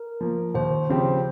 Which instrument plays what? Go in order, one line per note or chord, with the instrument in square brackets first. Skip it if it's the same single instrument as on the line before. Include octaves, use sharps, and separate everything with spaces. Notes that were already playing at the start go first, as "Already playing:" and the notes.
Already playing: [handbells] A#4
[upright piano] F3 A#3
[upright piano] D#2 [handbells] C5
[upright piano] C#3 F3 C4 G4